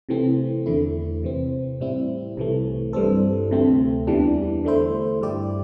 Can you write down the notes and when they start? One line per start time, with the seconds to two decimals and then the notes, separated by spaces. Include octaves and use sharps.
0.09 C3 E3 A3 C4
0.66 E2 D3 A3 E4
1.23 C3 E3 C4
1.80 A2 G3 C4 E4
2.37 C2 C3 E3 A3
2.93 G2 E3 G3 C4 A4
3.50 D2 C3 A3 C4
4.07 E2 E3 G3 D4
4.64 D3 A3 E4 C5
5.21 G2 G3 E4 G4 D5